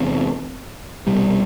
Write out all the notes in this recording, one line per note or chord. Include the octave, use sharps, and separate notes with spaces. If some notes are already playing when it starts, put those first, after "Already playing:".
Already playing: E2 C3
C2 B2 G3